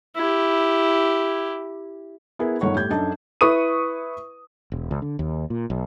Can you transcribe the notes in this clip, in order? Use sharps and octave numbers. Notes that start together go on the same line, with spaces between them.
E4 G4
B3 E4 G#4 A#4
G1 D#3 A3 C#5 F#5 C#6
A2 G3 G6 G#6
F#2 D4 D#4 A4 D#5 A5
E4 B4 C#6 D#6 D#7
E1
C#2
D3
D#2
A#2
B1